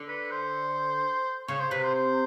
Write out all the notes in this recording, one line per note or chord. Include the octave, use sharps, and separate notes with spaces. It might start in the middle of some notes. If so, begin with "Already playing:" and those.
Already playing: D3
B4
C5
C#3 C#5
C5
C3 B4
C5
C5